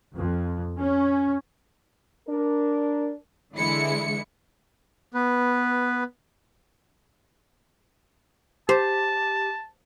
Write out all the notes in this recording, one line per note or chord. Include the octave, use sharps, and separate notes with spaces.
F2
C#4
D4 A#4
D3 E3 G#3 E4 C#7
B3 B4
G4 C5 A5